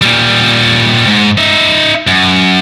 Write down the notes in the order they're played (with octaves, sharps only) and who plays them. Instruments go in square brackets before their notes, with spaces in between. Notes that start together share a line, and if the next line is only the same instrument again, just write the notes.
[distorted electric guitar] A#2 G3
G#2
D#4 E5
F#2